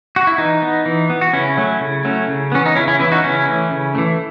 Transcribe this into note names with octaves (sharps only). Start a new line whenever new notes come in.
F#4
E4
E3 D#4
B3
E3
B3
F#4
C#3 C#4 E4
F#3 A3 C#4
C#3
F#3 A3 C#4
C#3
E3 B3 C#4
D#4
C#3 C#4 E4
C#4 E4
E3 B3 C#4 E4
D#4 F#4
C#3 C#4 E4
E3 A3
C#3
E3 A3